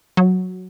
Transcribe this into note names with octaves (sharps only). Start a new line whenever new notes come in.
F#3